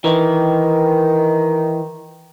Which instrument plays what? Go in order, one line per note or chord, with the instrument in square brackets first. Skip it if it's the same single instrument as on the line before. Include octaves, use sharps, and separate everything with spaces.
[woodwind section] D#3 [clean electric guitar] E3